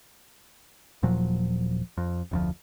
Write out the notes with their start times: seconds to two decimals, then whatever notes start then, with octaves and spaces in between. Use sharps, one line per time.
1.03 D#1 A#2 F3 F#3
1.97 F2
2.31 F1 D2 F3